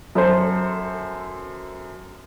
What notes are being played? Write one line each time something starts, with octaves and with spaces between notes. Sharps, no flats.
F#2 A4 C5